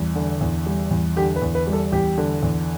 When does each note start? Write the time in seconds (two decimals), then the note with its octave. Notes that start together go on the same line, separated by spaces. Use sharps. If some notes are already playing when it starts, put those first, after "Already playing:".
Already playing: E2 G3
0.15 D3
0.41 E2
0.66 G3
0.91 E2
1.16 D3 G4
1.36 B4
1.42 E2
1.55 B4
1.67 G3
1.73 A4
1.92 E2 G4
2.18 D3
2.43 E2